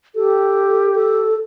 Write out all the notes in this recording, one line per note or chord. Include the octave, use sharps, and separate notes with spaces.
G4 A4
A4